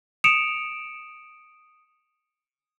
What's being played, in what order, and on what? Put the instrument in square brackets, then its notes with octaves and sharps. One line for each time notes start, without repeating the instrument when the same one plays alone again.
[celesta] D#6 C#7 D7 E7 F7